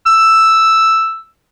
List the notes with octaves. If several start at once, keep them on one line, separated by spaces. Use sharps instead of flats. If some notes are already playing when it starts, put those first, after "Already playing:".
E6